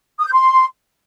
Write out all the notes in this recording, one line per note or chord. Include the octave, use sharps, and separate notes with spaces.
D#6
G6
C6